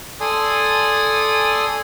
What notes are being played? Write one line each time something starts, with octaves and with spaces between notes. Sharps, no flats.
A4 D5 G#5 C6 D#6